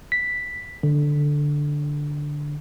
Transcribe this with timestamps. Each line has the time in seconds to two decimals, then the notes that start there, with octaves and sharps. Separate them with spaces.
0.12 B6
0.83 D3